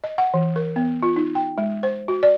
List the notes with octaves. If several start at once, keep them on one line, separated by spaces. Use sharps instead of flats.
D#5
F#5
E3
A#4
B3
F4
D#4
G5
G#3
C5
F#4
D5